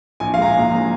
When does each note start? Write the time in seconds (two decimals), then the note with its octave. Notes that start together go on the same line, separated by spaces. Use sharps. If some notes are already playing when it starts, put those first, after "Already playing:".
0.20 A#1 G#5
0.34 F5
0.38 G#3 A#5
0.46 G#5
0.55 A#2 A#5
0.71 A#1 A#5